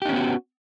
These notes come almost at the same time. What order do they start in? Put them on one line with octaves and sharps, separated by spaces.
G4 D#4 C#4 B3 F#4